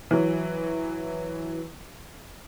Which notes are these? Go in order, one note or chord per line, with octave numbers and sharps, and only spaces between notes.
E3 F#3